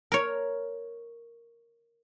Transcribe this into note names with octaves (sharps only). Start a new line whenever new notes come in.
A#4 C#5